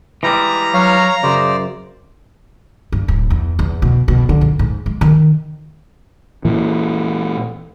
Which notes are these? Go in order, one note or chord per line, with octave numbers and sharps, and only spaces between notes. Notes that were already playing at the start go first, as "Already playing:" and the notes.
E3 G3 G#3 A#5
F#3 C#5 F5
F#2 C#3 C5 D5
G2
D1
E2
E2
B2
B2
D3
A#2
G#2
G#3
D#3
A#2 E3